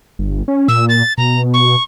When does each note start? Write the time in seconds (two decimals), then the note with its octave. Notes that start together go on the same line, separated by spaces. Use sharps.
0.19 G1
0.48 C#4
0.68 A#2 E6
0.89 A6
1.18 B2 A#5
1.54 C#6